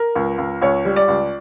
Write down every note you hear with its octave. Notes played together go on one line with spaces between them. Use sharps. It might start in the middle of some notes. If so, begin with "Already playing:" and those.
Already playing: A#4
C#2
C#2
C#2 C#5
G3
D5
C#2